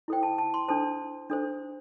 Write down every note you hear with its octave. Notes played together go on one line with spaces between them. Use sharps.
E4 A4 C5 G5
A5
A5
C6
D4 A4 C5 A5
D4 A4 C5